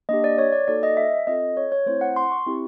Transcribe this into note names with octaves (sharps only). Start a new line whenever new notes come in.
A#3 D4 G4 D#5
D5
C#5
D5
A#3 D#4 F#4 A4 D5
D#5
E5
C4 F4 A4 D#5
C#5
C#5
A3 C4 E4 C5
F#5
C6
C#6
C4 E4 G4